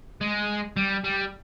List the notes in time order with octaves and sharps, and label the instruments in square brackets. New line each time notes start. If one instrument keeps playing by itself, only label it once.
[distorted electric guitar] G#3
G3
G3